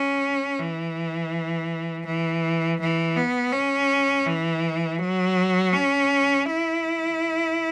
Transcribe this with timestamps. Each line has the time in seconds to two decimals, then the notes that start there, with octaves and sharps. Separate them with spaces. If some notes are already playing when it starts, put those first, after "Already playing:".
Already playing: C#4
0.59 E3
2.06 E3
2.80 E3
3.16 B3
3.52 C#4
4.26 E3
4.99 F#3
5.73 C#4
6.46 E4